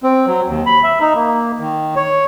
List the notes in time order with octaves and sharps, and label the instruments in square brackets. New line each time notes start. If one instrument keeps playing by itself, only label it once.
[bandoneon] C4
F#3
D#2
B5
E5
D#4
A#3
D#3
C#5